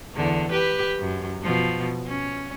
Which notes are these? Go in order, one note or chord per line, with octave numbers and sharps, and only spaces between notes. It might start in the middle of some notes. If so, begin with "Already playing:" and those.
E2 D3
G4 B4
F#2
B2 F3
C#4